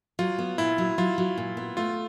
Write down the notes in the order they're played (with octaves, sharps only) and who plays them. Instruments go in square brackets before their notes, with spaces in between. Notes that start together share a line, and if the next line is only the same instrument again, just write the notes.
[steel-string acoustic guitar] F#3 [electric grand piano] F4
[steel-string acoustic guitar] B3
[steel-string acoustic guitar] A#2 [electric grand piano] E4
[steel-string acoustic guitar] F#3
[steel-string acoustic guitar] F#3 [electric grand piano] F4
[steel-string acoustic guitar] F#3
A#2
B3
[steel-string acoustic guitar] A3 [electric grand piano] F4